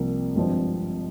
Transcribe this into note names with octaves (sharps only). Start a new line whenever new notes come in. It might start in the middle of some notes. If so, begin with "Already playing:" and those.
Already playing: C2 C3 F3 A#3
G#1 G2 F3 C4